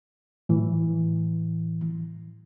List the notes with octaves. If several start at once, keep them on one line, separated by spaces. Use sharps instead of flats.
A2 E3